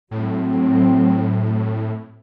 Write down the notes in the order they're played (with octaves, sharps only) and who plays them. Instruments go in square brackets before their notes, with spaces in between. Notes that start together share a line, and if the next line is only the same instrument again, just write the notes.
[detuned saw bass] A2 [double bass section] F#3 C4